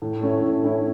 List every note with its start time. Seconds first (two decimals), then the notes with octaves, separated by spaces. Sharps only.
0.02 A2
0.21 A3 C#4 E4
0.42 A2
0.62 A3 C#4 E4